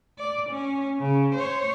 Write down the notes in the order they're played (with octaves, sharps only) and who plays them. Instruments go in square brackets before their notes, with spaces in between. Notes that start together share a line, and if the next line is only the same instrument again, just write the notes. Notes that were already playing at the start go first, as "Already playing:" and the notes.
[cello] D5
C#4
C#3
C5 C#5